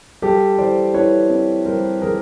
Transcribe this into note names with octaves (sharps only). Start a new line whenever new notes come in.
G3 G4 A4
E3 C5 D5
E4 B4 C#5
C4
G3 A#4 C5
E3 G#4 A#4